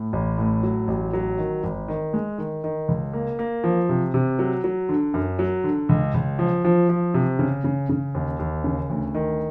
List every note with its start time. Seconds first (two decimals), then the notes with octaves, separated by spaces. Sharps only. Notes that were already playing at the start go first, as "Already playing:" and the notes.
Already playing: A2
0.13 A1
0.38 A2
0.63 F#3
0.88 A1
1.13 F#3
1.38 D#3
1.64 G#1
1.88 D#3
2.14 G#3
2.38 D#3
2.64 D#3
2.88 C#2
3.13 A#3
3.39 A#3
3.64 F3
3.89 C3
4.14 C3
4.39 F#3
4.64 F#3
4.89 D3
5.14 F#2
5.39 F#3
5.64 D3
5.89 C#2
6.14 C#2
6.39 F3
6.65 F3
6.89 F3
7.14 C3
7.39 C#3
7.64 C#3
7.89 C#3
8.15 D#2
8.39 D#2
8.64 C#3
8.90 D2
9.15 D#3